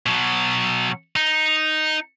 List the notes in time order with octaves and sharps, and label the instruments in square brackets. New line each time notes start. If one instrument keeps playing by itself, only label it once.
[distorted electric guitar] B2 F#3
D#4